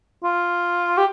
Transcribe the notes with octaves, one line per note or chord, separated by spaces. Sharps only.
F4
G4